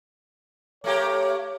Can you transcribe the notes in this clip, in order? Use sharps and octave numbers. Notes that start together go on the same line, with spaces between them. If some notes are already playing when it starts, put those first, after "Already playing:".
A3 A#3 G4 C#5